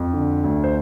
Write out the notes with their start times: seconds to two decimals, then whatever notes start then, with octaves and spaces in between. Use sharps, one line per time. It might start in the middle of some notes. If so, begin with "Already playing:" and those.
Already playing: F2
0.13 D3
0.44 D2
0.64 C5